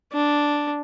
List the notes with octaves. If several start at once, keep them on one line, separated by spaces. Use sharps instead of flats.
D4